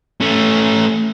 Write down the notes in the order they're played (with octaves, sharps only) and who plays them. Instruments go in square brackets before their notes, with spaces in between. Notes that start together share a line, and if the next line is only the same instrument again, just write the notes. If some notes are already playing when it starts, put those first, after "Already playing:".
[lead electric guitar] A3 C#4